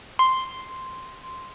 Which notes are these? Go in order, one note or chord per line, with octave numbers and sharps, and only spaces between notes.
C6